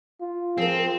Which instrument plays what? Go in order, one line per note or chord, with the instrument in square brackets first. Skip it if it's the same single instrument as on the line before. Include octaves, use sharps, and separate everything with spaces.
[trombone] F4
[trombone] F3 [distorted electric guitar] C4 [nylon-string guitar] G#4 A#4